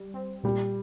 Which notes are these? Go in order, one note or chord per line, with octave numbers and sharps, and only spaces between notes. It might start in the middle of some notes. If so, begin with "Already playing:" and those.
Already playing: G3
C4
A#2 G3